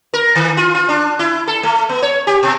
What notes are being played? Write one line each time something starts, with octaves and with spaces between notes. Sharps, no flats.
A#4
D#3
F4
F4
D4
E4
A4
A3
B3
C#5
G4
B2